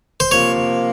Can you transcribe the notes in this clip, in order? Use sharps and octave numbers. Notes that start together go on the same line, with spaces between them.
C5
C3 F3 A#3 C#5